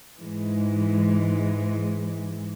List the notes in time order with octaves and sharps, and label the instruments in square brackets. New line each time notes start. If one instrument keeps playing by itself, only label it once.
[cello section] G#2 E3 G#3